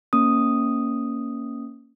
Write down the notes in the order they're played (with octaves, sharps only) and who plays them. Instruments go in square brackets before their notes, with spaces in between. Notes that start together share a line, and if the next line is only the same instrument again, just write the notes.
[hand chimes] A#3 C#4 D#6